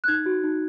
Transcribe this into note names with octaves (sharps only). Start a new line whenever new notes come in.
F#6
D#4 G#6
F#4
D#4